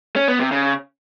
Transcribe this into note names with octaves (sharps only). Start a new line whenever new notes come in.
C#4
B3
C3
C#3